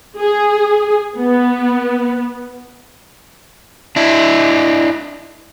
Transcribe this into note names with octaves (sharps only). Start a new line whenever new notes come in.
G#4
B3
D4 E4